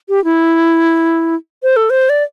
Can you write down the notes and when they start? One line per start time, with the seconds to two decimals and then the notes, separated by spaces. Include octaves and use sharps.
0.09 G4
0.24 E4
1.63 C5
1.76 A4
1.90 C5
2.09 D5